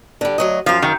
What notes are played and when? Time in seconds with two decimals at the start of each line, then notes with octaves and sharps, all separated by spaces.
0.21 D3 G3
0.38 D2 F#3 D#5
0.66 F#2 F3 F5
0.82 D#3